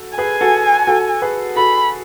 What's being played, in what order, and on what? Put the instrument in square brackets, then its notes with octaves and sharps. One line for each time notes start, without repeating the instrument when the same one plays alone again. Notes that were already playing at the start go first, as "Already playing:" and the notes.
Already playing: [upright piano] F#4 A4
[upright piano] G#4 B4 [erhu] G#5
[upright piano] F#4 A4
F#4 A4
G#4 B4
[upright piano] F#4 A4 [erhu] B5